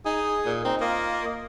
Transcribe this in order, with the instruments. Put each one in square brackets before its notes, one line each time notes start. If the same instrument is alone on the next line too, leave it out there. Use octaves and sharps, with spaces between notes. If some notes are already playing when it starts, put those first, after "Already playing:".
[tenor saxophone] D#4 [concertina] G#4 G#5 D#6
[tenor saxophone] A#2
[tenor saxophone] C4 [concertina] D#4
[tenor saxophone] A#3 [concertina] F4 D#5